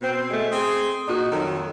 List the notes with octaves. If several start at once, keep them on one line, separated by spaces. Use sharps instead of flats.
B2 C4
B2 G#3 A3
C4 G#4
A#2 D#4 F#4
F2 D#3 F#3